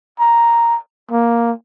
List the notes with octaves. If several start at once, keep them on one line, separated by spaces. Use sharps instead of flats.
A#5
A#3